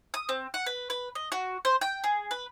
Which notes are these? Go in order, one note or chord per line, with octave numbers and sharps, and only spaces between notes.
D#6
C4
F#5
B4
B4
D#5
F#4
C5
G5
G#4
B4